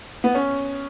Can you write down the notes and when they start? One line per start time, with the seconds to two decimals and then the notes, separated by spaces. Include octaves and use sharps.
0.24 B3
0.35 C#4